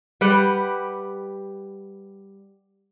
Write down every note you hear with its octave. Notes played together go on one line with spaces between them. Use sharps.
G3 G4 B4 F#5